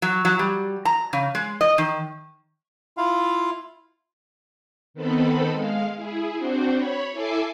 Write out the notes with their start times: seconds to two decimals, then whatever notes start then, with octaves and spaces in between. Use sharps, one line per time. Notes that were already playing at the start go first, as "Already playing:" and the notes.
0.02 F#3
0.25 F#3
0.39 G3
0.85 A#5
1.13 C#3
1.35 G#3
1.61 D#5
1.78 D#3
2.97 E4 F4 F5
4.94 D#3 B3 C4 A4 B5
5.52 G#3 F5
5.95 E4 G#4
6.38 C4 D4 F#4 C5
6.74 C#5 B5
7.12 E4 A4 E5 G#5 D6 C7